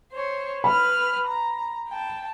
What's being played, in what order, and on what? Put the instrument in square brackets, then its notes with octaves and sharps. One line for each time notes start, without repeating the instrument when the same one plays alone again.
[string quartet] C5 C#5
[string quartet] B4 F6 [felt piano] B5
[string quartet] A#5
G5 A5